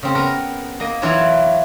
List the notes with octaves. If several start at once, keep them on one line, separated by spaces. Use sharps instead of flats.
C#3 C4
B3 A#4
A#3 D#5
E3 F#3 E4 F4 C#5